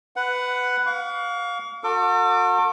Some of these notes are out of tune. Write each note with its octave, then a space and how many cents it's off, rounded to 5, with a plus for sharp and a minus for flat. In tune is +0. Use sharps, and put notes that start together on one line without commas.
B4 +15 F#5 +5
F5 +20 C#6 +45
F#4 -40 A4 +45 D6 +0